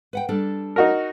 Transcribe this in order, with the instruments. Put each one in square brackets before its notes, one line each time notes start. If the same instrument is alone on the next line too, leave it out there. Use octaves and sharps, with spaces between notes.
[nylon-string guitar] B4 F#5 G5
G3 D4 A4
[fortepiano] D#4 F#4 A#4